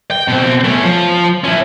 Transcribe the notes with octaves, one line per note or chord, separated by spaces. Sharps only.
G5
B2 C4
A3 C#4
F3
C#4 E4